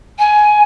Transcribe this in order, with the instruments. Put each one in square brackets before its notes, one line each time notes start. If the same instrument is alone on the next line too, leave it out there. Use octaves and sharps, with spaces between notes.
[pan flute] G#5